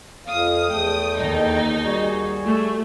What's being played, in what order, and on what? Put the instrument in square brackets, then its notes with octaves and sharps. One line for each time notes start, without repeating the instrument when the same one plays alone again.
[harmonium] F2 F5 [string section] D#6
[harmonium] E2 A3 G5
[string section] D#2 D#4
[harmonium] G3 F#4 G#4
[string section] A3